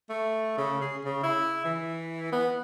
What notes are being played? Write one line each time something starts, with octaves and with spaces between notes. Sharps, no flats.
A3
C#3
G#4
C#3
E4
E3
B3